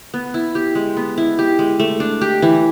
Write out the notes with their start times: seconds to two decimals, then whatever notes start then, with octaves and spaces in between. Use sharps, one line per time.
0.14 B3
0.34 E4
0.55 G4
0.75 G#3
0.97 B3
1.18 E4
1.39 G4
1.59 G#3
1.80 A3
2.00 D4
2.21 G4
2.42 E3